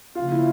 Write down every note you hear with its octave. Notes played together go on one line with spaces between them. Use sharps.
C#3 F3 A#3 C#4 F4
E4